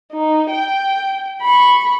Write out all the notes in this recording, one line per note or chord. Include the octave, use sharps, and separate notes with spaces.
D#4
G5
B5 C#6